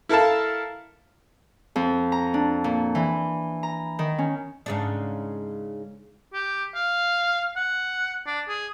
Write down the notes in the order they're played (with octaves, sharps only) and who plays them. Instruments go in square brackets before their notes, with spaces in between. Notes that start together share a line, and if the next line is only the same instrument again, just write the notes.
[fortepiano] E4 A4 A#4 F5 A5
[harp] F2
A#5
D4
A#2
E3
A#5
D#3
C#4
[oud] G#2 C#3 D4
[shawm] G4
F5
F#5
D4
G#4